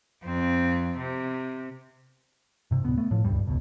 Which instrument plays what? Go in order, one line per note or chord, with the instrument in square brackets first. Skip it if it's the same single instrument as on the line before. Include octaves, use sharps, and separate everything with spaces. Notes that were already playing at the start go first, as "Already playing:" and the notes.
[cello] F2 C4
C3
[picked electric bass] G2 C3
D1 B3
A3 B3
A2 F3
D#1 C#2 G2 G3
F1 C#2 B2